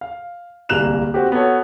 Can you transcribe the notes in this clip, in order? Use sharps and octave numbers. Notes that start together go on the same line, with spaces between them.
F5
D1 C2 A#3 F#6 E7 F7
C4 F#4 G4
B3 F#4 A4 C#5